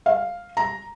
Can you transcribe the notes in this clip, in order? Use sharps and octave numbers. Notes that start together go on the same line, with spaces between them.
F5
A#5